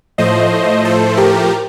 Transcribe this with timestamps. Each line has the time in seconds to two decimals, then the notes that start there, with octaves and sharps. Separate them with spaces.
0.18 A2 F3 A3 C5 D#5
0.85 A4 C5
1.17 G4 A#4